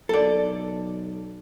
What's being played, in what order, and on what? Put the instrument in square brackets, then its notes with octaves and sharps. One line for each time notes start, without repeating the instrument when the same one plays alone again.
[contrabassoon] B1 [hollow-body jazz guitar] A4 D5